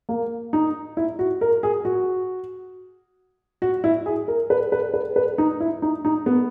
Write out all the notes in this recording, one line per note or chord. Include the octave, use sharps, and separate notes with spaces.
A#3
D#4
E4
F#4
A#4
G#4
F#4
F#4
E4
G#4
A#4
B4
B4
B4
B4
D#4
E4
D#4
D#4
B3